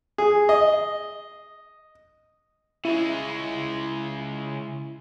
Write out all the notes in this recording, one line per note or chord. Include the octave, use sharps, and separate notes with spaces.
G#4
D#5
C#3 G#3 E4